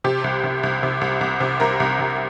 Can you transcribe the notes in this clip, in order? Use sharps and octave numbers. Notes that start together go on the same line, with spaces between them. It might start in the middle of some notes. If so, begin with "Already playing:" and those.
C3 G4
C2
C3
C2
C3
C2
C2
C3
C2 A#4
C2
C3